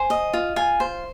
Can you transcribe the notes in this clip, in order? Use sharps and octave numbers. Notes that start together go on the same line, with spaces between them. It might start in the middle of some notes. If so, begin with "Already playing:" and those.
Already playing: C5 G#5
D#5
F4
F4 G#5
C5